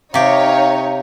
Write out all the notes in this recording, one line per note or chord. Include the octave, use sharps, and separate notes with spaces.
C3 D#4 G4 C#5 F5